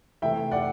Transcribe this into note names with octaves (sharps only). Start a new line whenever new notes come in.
C3 E3 A3 C4 E5 G5
D5 F#5